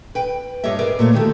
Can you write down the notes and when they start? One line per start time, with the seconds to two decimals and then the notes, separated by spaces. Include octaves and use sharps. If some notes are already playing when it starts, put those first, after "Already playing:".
0.15 B4 G5
0.64 G2 G4 C#5 D#5 E5
0.78 G#4 A#4 B4 D5
0.99 A#2 A3 C#5
1.13 D3 D#3 F#4 G4 A4